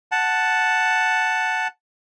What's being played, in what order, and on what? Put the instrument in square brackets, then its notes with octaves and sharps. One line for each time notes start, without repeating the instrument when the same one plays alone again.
[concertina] F#5 A5